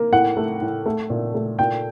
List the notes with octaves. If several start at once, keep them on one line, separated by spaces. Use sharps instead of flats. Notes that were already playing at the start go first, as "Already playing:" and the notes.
Already playing: A#3
A2 F#5
A3
A2
A3
A#2
A3
A#2 G5